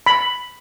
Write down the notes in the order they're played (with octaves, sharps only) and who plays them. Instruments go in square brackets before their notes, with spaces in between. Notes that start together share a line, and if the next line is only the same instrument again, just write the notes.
[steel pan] B5